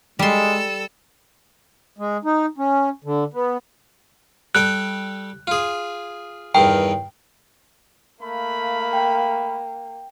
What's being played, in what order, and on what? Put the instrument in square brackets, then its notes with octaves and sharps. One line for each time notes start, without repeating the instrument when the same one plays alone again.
[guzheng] G3 C6 [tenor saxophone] G#3 [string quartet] A4 E6
[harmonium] G#3
D#4
C#4
D3
B3
[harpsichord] G3 A4 G5 [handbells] F#6
[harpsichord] F4 G#4
[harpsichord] E2 G2 D#3 [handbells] G5
[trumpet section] A3 F5 B5 [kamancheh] A#3
[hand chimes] G5